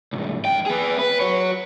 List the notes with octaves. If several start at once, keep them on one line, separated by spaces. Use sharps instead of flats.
C2 G#2
F2 G5
B3 G#4
B4
F#4 C#5